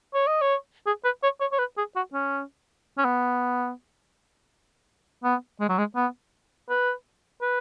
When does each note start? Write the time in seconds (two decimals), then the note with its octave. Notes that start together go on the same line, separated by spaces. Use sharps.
0.14 C#5
0.27 D#5
0.42 C#5
0.86 G#4
1.05 B4
1.23 C#5
1.41 C#5
1.52 C#5
1.59 B4
1.78 G#4
1.96 F#4
2.14 C#4
2.98 C#4
3.05 B3
5.24 B3
5.60 G#3
5.69 F#3
5.78 G#3
5.96 B3
6.70 B4
7.42 B4